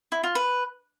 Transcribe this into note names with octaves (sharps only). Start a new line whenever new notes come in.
E4
F4
B4